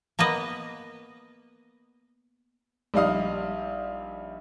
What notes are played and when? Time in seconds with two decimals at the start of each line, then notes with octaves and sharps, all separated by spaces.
0.19 A#3 B3 B4 D#5
2.94 A#1 G3 D#4 F5 D#6